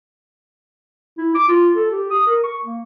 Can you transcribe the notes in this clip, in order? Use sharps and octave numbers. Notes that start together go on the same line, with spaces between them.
E4
D6
F4
A4
G4
D#6
A#4
C#6
A#3